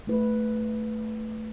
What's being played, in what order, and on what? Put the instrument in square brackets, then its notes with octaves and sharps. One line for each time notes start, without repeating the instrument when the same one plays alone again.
[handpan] A3 E4 B4